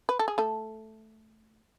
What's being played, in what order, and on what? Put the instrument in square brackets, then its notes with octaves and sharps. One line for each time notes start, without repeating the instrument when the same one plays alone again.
[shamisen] B4
A4
G#4
A3 A4